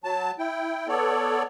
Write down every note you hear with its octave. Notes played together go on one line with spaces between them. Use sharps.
F#3 A5
E4 G5
B3 A4 C#5 D5